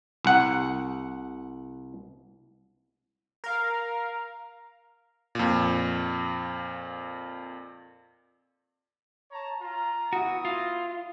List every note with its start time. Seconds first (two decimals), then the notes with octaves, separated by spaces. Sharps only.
0.25 C2 F#5
3.44 A#4 F5
5.35 F2 A#2
9.31 C#5 A5 A#5
9.61 F4 A#5
10.13 B3 E4 F#4 D#6
10.45 F4